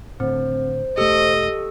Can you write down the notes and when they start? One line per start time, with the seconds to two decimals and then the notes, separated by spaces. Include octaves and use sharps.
0.20 A2 D3 C4 C5
0.97 E1 A3 G4 A4 D#5 E6